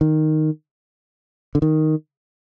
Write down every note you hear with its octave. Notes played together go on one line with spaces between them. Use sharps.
D#3
D3
D#3